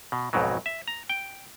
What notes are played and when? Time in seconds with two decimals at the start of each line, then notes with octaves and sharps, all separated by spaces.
0.12 B2
0.33 B1 F2 G#2 B2 F#3
0.66 E5
0.88 A#5
1.10 G5